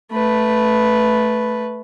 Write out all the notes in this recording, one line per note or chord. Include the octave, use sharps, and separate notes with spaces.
A3 B4